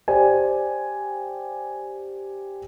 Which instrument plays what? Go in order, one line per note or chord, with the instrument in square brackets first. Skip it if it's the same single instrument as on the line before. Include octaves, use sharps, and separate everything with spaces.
[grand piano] G4 C5 D5 G#5